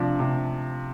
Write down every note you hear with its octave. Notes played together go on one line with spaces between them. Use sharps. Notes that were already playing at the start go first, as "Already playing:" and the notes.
Already playing: C3 F3 D4
C3